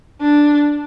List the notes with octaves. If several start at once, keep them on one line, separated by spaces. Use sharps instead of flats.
D4